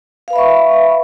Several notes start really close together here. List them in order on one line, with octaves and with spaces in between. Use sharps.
F5 B4 B5 E5 C#6